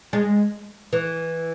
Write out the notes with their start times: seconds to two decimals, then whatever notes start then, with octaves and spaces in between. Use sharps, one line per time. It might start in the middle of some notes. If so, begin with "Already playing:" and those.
0.13 G#3
0.93 E3